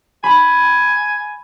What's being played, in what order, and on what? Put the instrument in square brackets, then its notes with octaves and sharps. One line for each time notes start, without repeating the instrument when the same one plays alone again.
[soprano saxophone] G#5 [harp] B5